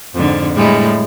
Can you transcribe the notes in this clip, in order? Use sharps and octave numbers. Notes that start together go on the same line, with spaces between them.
F2 G#2 D3
A2 G3 G#3